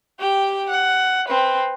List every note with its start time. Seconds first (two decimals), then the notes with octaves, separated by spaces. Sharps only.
0.19 G4 G5
0.70 F#5
1.28 C4 B4